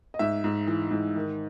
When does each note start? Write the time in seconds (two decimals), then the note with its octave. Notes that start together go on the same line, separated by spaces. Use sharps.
0.14 D#5
0.19 G#2 E5
0.44 G#2
0.67 E3
0.91 G#2
1.16 D#3